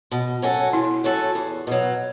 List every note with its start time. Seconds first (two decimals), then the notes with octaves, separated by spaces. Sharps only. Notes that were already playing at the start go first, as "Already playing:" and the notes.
0.11 B2
0.42 F#3 C#4 F#4 A4
0.73 B2 E4
1.04 F#3 C#4 F#4 A4
1.35 E2
1.67 B2 F#3